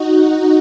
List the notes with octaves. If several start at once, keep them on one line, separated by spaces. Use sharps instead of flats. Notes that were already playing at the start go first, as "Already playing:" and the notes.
Already playing: D#4 F#4